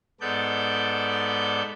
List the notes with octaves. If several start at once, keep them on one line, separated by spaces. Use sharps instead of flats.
G#2 B3 A4 D5 G6